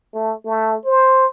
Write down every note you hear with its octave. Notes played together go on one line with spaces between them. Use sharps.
A3
A3
C5